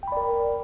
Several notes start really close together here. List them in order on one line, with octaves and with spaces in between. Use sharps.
G5 B5 D5 A#4